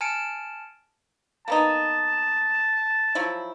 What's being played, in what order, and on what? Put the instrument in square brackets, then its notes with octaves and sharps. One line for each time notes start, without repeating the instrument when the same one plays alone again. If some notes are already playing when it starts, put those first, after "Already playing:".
[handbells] G#5 A5 F6 C#7 D7
[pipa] A#3 B3 D#4 [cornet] A5
[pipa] F3 F#3 E4